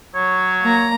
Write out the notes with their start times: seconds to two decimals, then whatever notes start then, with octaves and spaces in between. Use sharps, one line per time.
0.15 F#3 C#5
0.61 A#3 A#5